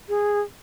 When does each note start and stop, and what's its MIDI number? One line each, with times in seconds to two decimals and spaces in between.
0.09 0.40 68